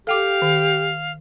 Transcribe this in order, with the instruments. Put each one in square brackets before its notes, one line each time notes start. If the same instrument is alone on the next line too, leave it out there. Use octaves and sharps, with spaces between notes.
[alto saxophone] G4 [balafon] A4 G5 D6 [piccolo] F5
[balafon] D#3